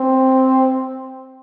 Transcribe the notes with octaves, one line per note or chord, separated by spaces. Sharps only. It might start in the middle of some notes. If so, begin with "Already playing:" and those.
Already playing: C4